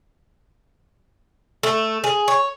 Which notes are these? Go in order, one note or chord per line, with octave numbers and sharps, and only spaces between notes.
A3
G#4
C#5